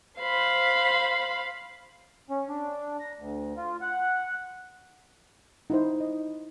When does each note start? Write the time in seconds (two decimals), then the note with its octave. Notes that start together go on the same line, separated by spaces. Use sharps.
0.21 C5 F5 B5
2.30 C#4
2.48 D4
3.00 A#5
3.19 D2
3.57 F4
3.81 F#5
5.70 D#4 E4 C5
6.00 D#5